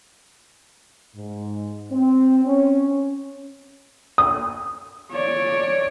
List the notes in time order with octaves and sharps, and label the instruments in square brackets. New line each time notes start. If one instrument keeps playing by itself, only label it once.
[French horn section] G#2
C4
C#4
[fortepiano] D#6
[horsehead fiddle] C#5 D5